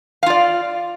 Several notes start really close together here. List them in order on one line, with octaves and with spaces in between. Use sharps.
F5 F4 D5